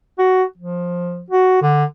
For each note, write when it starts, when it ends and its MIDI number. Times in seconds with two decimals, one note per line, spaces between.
0.19 0.43 66
0.58 1.23 53
1.30 1.60 66
1.62 1.84 50